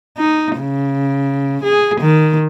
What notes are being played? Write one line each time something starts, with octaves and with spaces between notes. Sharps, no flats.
D#4
C#3
G#4
D#3